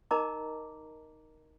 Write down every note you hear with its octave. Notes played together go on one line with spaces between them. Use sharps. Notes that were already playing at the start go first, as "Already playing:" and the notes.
D#4 A#4 D#5 A5 A#5 D6